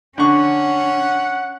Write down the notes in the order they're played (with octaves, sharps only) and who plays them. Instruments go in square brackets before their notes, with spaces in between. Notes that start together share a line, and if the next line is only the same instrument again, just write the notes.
[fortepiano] D3 C#6 [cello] C#4 [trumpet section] F#5